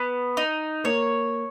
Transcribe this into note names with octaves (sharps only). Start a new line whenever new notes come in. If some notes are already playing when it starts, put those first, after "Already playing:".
Already playing: B3
D#4
A#3 C#5